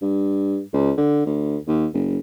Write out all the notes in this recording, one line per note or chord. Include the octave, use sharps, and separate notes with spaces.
G2
C#2
D3
D2
D#2
F#1